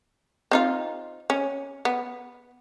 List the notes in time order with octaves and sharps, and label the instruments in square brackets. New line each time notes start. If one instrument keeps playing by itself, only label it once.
[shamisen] C4 D#4 F4
C#4
B3